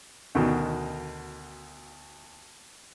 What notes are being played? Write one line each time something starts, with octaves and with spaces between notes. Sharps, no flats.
D2 B2 D#3